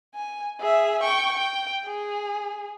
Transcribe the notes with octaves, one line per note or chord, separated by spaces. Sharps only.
G#5
G#4 E5
G5 C#6
G5
G#4